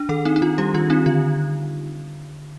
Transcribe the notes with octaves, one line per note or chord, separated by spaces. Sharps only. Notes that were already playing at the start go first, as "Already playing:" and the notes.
Already playing: D4
D#3 A4
C4 D#4
D#4
D#3 F4
G3 G4
D#3 F4
C4 D#4
D3 F4